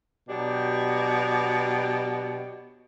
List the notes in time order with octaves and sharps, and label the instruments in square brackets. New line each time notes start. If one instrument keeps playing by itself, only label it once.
[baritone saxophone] B2 [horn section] F#3 D4 G4